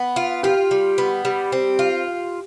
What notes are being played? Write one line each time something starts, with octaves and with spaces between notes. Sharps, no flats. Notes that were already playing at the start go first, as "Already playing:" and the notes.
Already playing: B3
F4
F4 G4
G3
B3
G3
C4
F4